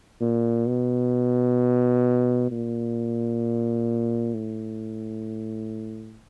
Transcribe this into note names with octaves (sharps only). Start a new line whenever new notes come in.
A#2
B2
A#2
A2